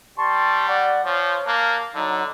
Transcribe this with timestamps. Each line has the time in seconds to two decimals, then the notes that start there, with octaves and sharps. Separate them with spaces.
0.18 G3 A5 C6 C#6
0.69 D5 F#5
1.05 F3 C#5
1.47 A#3 A5 F#6
1.95 D3 F#3 D#4